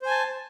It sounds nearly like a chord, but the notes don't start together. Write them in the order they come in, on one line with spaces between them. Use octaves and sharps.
C5 G#5 A5